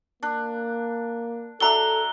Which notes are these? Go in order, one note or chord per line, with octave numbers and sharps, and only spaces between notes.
A#3 D4
F#3 D4 A4 E5 A#5 G7